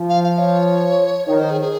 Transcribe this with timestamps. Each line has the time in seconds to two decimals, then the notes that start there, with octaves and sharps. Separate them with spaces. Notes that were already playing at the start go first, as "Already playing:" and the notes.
Already playing: F3
0.09 F5
0.24 F5
0.39 C#5
1.28 D#3 C#5
1.39 C5
1.50 G#4
1.61 G#4